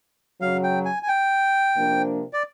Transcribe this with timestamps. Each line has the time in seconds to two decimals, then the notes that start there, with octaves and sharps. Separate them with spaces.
0.41 F#2 C#3 F#3 F5
0.63 G5
0.85 G#5
1.03 G#5
1.08 G5
1.75 C3 F3 A#3 D4
2.33 D5